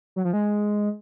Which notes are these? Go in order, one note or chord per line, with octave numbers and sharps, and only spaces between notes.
F#3
F3
G#3